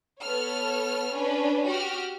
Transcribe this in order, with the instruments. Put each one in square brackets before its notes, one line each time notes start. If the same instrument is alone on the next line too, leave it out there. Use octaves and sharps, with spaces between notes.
[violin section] B3 A4 C#5 F6
C#4 D4 B4 C#5
F#4 G4 F6